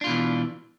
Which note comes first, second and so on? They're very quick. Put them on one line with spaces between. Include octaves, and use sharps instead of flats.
D4 F4 B2 E3